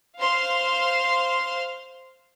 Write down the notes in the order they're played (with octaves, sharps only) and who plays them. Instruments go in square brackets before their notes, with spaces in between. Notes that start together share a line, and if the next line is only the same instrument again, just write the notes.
[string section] C5 F5 C6 F6